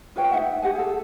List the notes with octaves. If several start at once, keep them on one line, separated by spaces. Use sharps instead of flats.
F4 B4 C#5 G5
D#4 E5 F#5
G4 F#5 G#5
G#4 A4